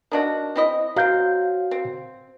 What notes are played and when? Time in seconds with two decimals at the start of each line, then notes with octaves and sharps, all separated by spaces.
0.11 D#3 D4 F#4
0.56 C4 E4 D#5
0.96 F#3 C4 F#4 F5 G6
1.71 C4